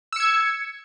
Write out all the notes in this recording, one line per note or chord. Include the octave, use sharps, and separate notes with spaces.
E6 G#6 C#7